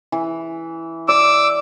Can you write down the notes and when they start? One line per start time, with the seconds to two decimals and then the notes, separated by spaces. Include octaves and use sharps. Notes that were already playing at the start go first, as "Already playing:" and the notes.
0.12 E3
1.08 D5 D6 E6